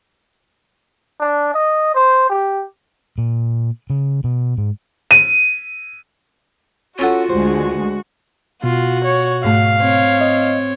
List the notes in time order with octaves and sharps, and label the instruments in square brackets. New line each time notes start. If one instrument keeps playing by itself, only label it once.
[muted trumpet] D4
D#5
C5
G4
[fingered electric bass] A#2
C#3
B2
G#2
[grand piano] D#7
[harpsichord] C#4 A4 F#5 [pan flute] F4 [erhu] F#4
[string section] D2 G#3 [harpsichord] C5
[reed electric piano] B2 [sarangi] F4 [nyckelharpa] F#4
[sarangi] C#5
[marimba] G#2 A3 [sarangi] F5
[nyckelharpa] C4 C#5
[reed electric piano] D#5